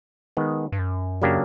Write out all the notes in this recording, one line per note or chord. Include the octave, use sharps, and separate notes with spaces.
D#3 G#3 B3
G2
F#2
C#3 F#3 A#3 D4 G4